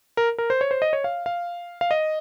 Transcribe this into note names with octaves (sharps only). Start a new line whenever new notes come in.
A#4
A#4
C5
C#5
C5
D#5
C#5
F5
F5
F5
D#5